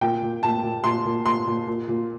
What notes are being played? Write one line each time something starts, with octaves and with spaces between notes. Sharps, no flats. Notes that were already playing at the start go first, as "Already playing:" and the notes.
A#2 G5
A#2
A#2 A5
A#2
A#2 C6
A#2
A#2 C6
A#2
A#2
A#2